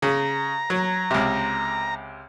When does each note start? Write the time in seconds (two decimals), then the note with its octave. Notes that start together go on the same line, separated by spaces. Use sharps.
0.02 C#3 A#5
0.70 F#3
1.11 C#2 C3